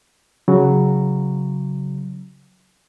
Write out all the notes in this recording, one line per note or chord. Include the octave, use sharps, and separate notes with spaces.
C#3 F#3